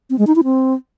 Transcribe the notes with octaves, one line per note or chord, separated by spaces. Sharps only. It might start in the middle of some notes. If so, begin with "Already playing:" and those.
C4
G#3
D#4
E4
C4